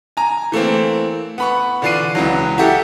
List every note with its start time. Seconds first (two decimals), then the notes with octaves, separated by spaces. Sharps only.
0.17 G#5 A#5
0.52 E3 A3 A#3 C4
1.38 B3 B5 C#6
1.82 D3 E3 D4 F4 C7 D#7
2.15 C#2 E3 F#3
2.58 E4 F#4 G4 A4